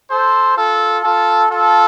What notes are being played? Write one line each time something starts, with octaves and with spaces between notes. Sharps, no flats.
A4 C5
F4 A4
F4 A4
F4 A4